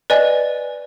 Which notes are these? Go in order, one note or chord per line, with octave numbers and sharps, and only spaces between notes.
B4 D5 D#5 G#5